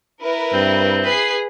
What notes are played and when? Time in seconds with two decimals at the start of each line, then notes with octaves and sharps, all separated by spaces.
0.21 E4 A#4 B4
0.54 G2 C4
1.04 G#4 B4 C7